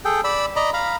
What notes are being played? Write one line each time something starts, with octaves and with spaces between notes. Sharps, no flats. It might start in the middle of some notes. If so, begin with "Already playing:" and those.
G#4 A4 G5
D5 B5 E6
D5 D#5 A#5 B5
F5 A#5 B5